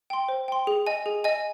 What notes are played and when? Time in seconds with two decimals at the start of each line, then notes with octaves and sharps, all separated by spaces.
0.10 G5 C6
0.29 C5
0.48 G5 C6
0.67 G#4
0.87 D#5 G#5
1.06 G#4
1.24 D#5 G#5